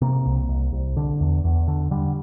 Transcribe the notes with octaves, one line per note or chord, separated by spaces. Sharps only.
C3 A#3
C2
C2
C2
D3
E2
E2
D3
D3 G3